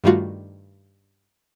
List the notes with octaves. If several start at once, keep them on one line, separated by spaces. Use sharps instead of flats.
G2 D#3 G3 A3 F4 F#4